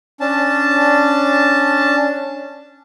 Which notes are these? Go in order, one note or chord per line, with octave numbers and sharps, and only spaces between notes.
C#4 D4 A5